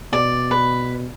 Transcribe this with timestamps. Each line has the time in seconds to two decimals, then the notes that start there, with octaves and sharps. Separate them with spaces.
0.13 B2 D5
0.51 B4